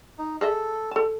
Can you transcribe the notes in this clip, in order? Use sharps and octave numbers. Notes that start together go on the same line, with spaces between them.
D#4
G#4 A4 D#5 E5
A4 A5